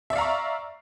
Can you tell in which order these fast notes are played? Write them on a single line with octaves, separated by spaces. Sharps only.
E5 D5 F5 A#5 C#6